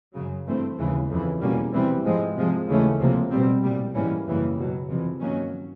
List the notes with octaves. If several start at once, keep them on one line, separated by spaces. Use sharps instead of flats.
F#2 C#3 F#3
G2 E3 A3 C4
D#2 C#3 E3 G#3
F2 C#3 E3
E2 B2 G3 A#3 C#4
C3 E3 G3 C4
G#2 F3 G#3 C4
C3 F3 G#3
D#2 C#3 E3 A3 C#4
C#2 C3 F3 A#3
B2 G3 C4
C2 A#2 G3
G#2 E3 G3 A#3 C#4
F#2 C#3 E3 G3 A#3
C#2 B2 F#3
F2 C3 E3
G2 D#3 F#3 A#3 C#4